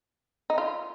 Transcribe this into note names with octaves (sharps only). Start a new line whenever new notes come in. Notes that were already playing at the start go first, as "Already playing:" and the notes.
D#4
F4